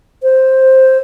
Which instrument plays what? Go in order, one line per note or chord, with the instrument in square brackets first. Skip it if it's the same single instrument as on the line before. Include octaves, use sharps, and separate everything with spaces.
[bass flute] C5